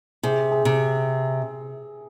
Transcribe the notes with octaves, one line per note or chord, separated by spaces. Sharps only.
C3 G#4
G#4
C3